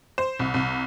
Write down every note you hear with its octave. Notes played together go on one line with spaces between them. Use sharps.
C5
C2
C2